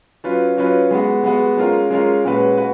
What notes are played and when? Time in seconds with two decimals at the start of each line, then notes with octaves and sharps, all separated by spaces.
0.24 F#3 C#4 F4 B4
0.57 F#3 C#4 F4 B4
0.91 G#3 B3 F#4
1.24 G#3 B3 F#4
1.57 G#3 C#4 F4 A#4
1.90 G#3 C#4 F4 A#4
2.24 A#2 G#3 C#4 F#4 B4
2.58 F#4 B4